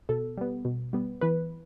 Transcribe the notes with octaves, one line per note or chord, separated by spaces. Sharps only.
B2 A4
G3 B3
B2
G3 B3
E3 B4